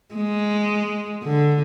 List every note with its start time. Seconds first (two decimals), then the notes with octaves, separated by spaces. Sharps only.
0.15 G#3
1.24 D3